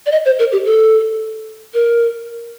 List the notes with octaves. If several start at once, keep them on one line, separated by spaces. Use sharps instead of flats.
D5
D#5
C5
A#4
G4
A4
A#4